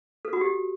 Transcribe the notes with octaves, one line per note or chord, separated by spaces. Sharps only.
A4
F#4
G4